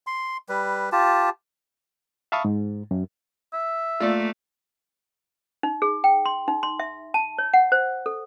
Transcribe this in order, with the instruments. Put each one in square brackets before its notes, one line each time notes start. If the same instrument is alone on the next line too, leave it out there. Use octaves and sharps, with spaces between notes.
[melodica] C6
G3 B4
F4 G4 A5
[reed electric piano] E5 F5 A5 B5 C#6 D#6
G#2
F#2
[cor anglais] E5
[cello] A3 A#3 [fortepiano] F4 D5
[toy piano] D#4
G#4
G5
C6
D#4
C6
E5
A5
C#5
F#5
C5
A4